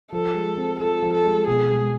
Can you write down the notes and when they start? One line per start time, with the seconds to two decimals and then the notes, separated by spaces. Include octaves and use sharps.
0.12 F3 A4
0.34 G#3
0.57 C4
0.80 F4 A4
1.02 F3
1.13 A4
1.25 G#3
1.47 B2 G#4
1.70 G#3